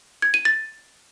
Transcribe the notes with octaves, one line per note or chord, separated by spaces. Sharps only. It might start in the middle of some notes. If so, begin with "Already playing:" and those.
G#6
D#7
A6